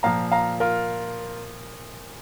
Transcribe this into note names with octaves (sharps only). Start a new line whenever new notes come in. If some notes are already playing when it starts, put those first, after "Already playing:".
A#2 F3 F5 A#5
F5 A#5
F4 A#4